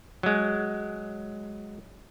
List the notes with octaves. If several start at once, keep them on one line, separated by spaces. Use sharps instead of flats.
F#3 G#3